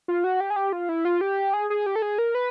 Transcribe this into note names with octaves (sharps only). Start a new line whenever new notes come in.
F4
F#4
G4
G#4
G4
F4
E4
F4
G4
G#4
G#4
G4
A4
G#4
A#4
B4